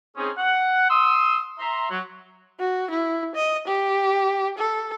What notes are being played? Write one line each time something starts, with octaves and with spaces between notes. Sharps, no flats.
C4 C#4 D#4 G#4
F#5
C6 D#6 E6
E5 A#5 C6
F#3
F#4
E4
D#5
G4
A4